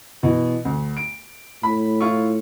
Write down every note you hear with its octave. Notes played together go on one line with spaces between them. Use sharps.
B2 E3
D2
D7
A2 B5
E4 F4 C#6